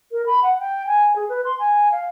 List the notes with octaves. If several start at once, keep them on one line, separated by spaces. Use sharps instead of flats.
A#4
B5
F#5
G5
G#5
G#4
B4
C6
G#5
F5